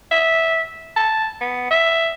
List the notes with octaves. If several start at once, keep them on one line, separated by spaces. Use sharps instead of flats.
E5
A5
B3
E5